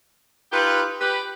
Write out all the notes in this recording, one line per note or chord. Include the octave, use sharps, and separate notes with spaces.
D#4 F4 G4 B4
G4 B4